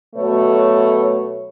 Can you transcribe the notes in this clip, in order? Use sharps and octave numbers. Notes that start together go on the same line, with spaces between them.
B2 F#3 A3 B4 C#5